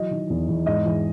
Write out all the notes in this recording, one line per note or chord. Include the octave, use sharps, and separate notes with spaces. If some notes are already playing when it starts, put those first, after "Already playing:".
Already playing: E3 F#3 D#5
D#3
E2
E2
G#2 D#5
E3